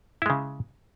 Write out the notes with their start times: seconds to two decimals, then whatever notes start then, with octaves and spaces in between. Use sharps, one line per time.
0.22 E4
0.26 G#3
0.30 C#3